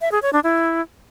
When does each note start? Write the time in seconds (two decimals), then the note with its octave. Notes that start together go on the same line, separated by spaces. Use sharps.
0.01 E5
0.12 G#4
0.22 C#5
0.33 D4
0.44 E4